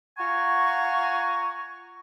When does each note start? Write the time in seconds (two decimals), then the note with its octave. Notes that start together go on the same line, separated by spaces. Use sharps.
0.17 F4 F#5 G#5 A#5 C#6